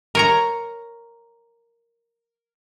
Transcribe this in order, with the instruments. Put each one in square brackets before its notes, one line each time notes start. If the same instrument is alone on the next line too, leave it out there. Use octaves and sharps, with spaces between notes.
[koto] A#4 C#5 A#5